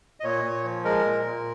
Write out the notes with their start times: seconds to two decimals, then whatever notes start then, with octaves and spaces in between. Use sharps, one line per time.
0.20 D#5
0.24 A#2 C#5
0.44 A#2
0.64 F3
0.84 G#3 A#4
1.05 A#2
1.25 A#2